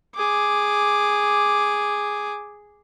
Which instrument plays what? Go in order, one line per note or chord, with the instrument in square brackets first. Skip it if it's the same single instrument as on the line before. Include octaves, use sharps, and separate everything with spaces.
[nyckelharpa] G#4 D6